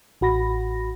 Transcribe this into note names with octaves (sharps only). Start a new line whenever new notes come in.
A1 F#4 B5 A#6